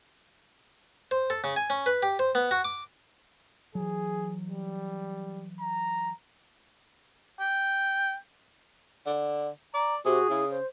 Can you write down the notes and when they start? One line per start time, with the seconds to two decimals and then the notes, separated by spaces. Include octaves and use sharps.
1.11 C5
1.30 A4
1.44 C#3
1.56 G#5
1.70 C#4
1.86 B4
2.03 G4
2.19 C5
2.35 B3
2.51 F#4
2.65 D6
3.75 E3 F#3 G#4
4.48 G3
5.60 A#5
7.40 G5
9.06 D3
9.74 D5 A#5
10.05 C3 F#4 G#4
10.30 C#3 E4
10.50 C5